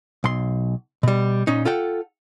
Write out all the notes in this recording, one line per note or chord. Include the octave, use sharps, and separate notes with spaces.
B1 C6
B2 G3
A#2 C#4 D#4
F4 A4 F#5 G5